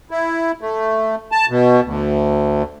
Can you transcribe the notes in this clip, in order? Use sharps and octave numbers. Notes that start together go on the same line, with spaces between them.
E4
A3
A5
B2
D2